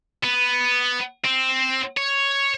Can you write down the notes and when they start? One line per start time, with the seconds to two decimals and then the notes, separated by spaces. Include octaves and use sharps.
0.24 B3
1.25 C4
1.97 C#5